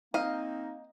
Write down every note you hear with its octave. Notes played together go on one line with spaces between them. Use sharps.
A#3 C4 D#4 D#5 F5